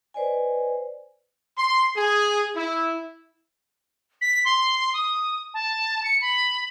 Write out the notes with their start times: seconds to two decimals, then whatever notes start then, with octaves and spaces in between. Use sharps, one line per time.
0.14 B4 C5 D5 D#5 G#5
1.58 C6
1.96 G#4
2.56 E4
4.21 B6
4.45 C6
4.94 D#6
5.54 A5
6.04 C#7
6.21 B5